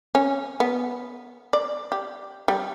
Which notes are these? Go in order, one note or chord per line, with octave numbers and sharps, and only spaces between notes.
C#4
B3
D5
G4
G3